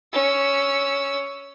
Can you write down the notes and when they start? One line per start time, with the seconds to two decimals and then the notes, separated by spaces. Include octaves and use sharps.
0.13 C#4 E6